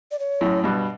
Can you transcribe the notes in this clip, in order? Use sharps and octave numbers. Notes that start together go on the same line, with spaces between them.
D5
C#5
F#2 A2
G2 B2